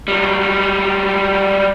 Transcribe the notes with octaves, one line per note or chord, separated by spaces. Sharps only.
F#3 G3